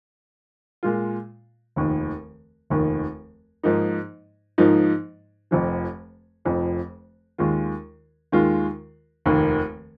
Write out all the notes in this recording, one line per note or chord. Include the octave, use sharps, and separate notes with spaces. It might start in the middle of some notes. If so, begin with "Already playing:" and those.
A#2 G#3 F4
F1 D#2 D#3
F1 D#2 D#3
G#2 F3 A#3 D#4
G#2 F3 A#3 D#4
F1 F2 F3
F1 F2 F3
D#2 D#3 G#3 F4
D#2 D#3 G#3 F4
F1 D#2 D#3 A#3